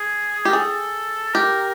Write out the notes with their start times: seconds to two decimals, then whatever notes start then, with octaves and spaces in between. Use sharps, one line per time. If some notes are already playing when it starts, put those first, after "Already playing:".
Already playing: G#4
0.45 G4
0.49 A#4
0.53 G#4 A4
1.34 G4 A#4